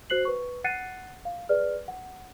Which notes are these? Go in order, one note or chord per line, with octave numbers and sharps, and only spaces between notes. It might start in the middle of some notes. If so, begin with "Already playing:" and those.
F#4 C5 F#6 C7 F#7
B4 C#6
F#5 F#6 A6 C7 C#7 D#7
F5
G#4 B4 D5 F6
F#5